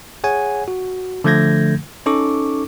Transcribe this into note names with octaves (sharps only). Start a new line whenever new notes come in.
G#4 C#5 F#5 G#5
F#4
D3 F3 A3 G6 G#6 A#6
C#4 D#4 A4 C#6 D6